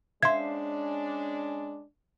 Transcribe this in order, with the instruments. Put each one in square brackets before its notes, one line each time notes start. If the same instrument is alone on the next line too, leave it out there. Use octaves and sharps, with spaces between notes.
[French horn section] G#3 C#4 D4 [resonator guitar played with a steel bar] C5 E5 F5 [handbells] C6 G#6